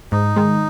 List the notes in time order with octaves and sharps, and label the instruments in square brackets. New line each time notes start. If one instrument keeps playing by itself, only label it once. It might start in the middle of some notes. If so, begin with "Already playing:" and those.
[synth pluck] G#2 [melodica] D#4
[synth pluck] D#3 G#3